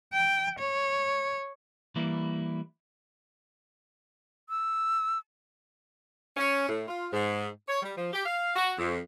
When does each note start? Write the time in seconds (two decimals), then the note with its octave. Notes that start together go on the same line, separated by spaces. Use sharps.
0.13 G5
0.59 C#5
1.96 E3 G3 A#3 E4
4.49 E6
6.37 C#4
6.68 A2
6.87 F4
7.13 G#2
7.68 C#5
7.82 G3
7.97 F3
8.13 G4
8.25 F5
8.56 F#4
8.78 F2